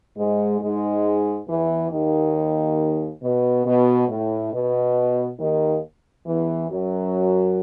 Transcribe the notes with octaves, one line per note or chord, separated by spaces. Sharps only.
G#2 G#3
G#2 G#3
E2 E3
D#2 D#3
B2
B2
A2
B2
D#2 D#3
E2 E3
F#2 F#3